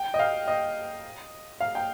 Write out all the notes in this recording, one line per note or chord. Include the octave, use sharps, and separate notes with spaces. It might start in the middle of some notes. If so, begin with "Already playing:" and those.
Already playing: G5
D#5
F5
D#5
F5
G5